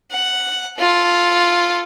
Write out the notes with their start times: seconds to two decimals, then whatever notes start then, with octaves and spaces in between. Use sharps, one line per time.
0.12 F#5
0.79 F4 A4